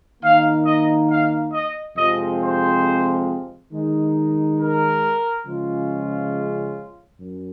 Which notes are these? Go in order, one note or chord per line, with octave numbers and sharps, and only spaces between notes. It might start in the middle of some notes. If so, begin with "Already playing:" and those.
D#3 A#3 D#4 F5
D#5
F5
D#5
F2 C3 F3 G#3 C4 D#5
C5
D#3 G#3 D#4
A#4
C#3 F3 G#3 C#4 F4
F#2